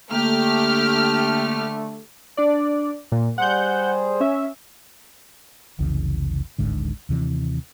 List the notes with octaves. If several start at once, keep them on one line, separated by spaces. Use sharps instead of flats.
D3 A3 A#3 G4 F6
D4 D5
A#2
G3 G#4 C5 F#5 G6
C#4 E5
F1 C2 C#3 E3
D1 G#1 G#2 D3
D#2 C3 E3